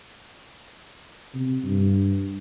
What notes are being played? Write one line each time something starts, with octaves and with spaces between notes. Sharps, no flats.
C3
G2